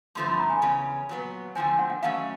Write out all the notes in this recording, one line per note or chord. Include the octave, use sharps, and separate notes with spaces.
G2 D3 F3 A3 C4 C6
B5
A#5
G#5
E2 C#3 C#4 G#5
A#2 F#3 B3
D3 F3 A3 C4 G#5
G#5
F#5
F#5
D#3 F#3 A3 C#4 F5